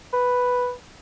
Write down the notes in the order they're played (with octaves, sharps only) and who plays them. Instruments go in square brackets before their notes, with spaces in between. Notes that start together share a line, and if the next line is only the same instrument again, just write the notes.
[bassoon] B4